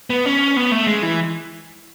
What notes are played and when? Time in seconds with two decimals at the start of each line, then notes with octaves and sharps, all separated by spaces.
0.10 B3
0.26 C#4
0.57 B3
0.72 A3
0.87 G#3
1.03 E3